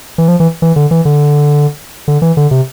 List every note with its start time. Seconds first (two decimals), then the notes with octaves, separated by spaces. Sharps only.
0.18 E3
0.28 F3
0.40 E3
0.62 E3
0.76 D3
0.91 E3
1.05 D3
2.08 D3
2.22 E3
2.37 D3
2.51 C3